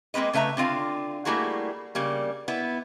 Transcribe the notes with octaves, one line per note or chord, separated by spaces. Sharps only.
G#3 A#3 C4 B4 D#5
C#3 A3 B4 E5 A#5
D3 C4 F4 F5
G3 A3 A#3 E4 F#4 G#4
C#3 G3 A#3
B3 E4 B4